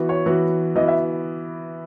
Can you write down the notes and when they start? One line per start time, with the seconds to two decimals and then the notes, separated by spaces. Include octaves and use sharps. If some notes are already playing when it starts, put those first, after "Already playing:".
Already playing: E3 B3 F#4
0.09 C#5
0.26 E3 B3 F#4
0.76 E3 B3 F#4 D#5
0.88 E5